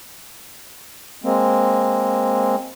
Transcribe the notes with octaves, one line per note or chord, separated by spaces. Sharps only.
G#3 A#3 C4